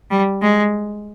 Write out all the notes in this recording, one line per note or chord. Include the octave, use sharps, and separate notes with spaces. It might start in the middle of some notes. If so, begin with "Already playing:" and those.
G3
G#3